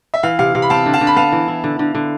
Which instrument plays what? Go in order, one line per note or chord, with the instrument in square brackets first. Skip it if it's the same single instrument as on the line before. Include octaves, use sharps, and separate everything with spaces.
[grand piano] E5
[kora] E3 [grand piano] F5
[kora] C3 [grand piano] F5
[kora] C3 [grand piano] F5
[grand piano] B5
[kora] C4 [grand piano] F5 A5
[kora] D3
[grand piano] F5 A5
[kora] D3
[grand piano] B5
[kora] B3 [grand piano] F5 A5
[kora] E3
E4
D3
D3
D3